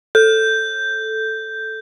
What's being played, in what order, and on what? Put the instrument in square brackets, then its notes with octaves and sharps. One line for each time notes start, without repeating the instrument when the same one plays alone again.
[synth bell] A4 [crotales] G6